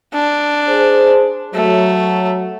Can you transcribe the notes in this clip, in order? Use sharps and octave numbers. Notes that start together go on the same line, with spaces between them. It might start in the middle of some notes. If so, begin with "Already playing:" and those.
D4
G#4 C5
F#3 A3